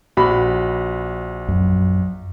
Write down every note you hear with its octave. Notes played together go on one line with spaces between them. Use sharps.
A#1 F#4 B5
F#2